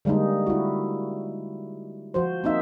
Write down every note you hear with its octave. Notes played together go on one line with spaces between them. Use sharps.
D3 G3 G#3 A#3 D#4
E4 F#4
F3 F#4 C5
A#3 C4 D#4 E5